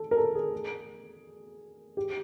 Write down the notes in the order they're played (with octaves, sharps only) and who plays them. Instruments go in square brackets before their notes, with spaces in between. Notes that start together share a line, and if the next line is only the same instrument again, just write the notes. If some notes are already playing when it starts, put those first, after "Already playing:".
Already playing: [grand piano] A4
A#4
A4
G#4
G4